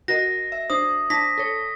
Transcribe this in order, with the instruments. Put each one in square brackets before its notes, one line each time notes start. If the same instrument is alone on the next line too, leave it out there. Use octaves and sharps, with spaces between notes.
[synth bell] F#4 A#4 D#5 [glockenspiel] A#6
[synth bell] E5
[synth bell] D4 C5 [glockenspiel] D#6
[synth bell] D4 A5 [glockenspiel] A#6 B6
[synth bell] A4 C#5